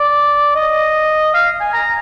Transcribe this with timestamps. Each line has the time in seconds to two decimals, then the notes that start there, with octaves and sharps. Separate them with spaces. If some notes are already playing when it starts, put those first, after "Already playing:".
Already playing: D5
0.56 D#5
1.34 F5
1.61 G#5
1.73 A#5